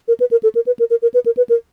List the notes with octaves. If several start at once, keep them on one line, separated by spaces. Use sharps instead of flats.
A#4
B4
A#4
A4
A#4
B4
A#4
A#4
A#4
B4
A#4
B4
A#4